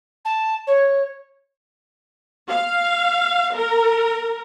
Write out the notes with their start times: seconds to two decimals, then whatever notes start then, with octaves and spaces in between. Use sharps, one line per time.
0.25 A5
0.67 C#5
2.48 F5
3.54 A#4